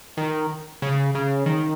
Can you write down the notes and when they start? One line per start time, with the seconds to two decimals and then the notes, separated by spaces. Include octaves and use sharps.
0.17 D#3
0.82 C#3
1.15 C#3
1.46 D#3